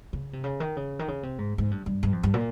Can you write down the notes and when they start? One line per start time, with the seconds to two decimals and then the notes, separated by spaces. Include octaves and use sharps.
0.13 C#3
0.33 C3
0.44 C#3
0.60 D#3
0.76 C#3
0.99 D#3
1.08 C#3
1.23 C3
1.38 G#2
1.58 G#2
1.71 G2
1.86 G2
2.03 G2
2.12 F2
2.23 G2
2.34 A#2